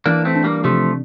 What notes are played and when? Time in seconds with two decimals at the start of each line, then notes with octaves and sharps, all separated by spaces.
0.06 E3 A#3 D4
0.25 A3 C4
0.35 D4
0.44 G3 A#3
0.64 C3 F3 A3